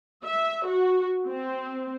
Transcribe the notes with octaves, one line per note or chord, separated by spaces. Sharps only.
E5
F#4
C4